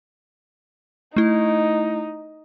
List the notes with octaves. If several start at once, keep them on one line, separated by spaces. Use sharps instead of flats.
A3 D#4 E4